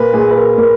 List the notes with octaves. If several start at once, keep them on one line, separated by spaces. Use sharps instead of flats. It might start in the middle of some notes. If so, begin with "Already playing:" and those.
Already playing: A#2 A#4 B4
A#2 G#4
B4
A#4
A#2 A#4